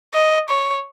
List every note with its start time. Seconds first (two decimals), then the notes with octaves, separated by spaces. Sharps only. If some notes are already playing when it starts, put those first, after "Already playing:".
0.14 D#5
0.49 C#5